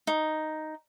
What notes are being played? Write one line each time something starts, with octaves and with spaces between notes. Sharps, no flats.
D#4